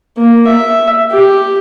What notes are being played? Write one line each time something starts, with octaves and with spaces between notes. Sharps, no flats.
A#3
E5
G4